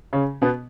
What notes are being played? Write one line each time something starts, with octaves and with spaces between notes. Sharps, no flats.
C#3 C#4
B2 B3